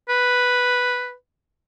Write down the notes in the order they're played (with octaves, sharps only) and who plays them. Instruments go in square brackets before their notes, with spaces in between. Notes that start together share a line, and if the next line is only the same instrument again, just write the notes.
[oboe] B4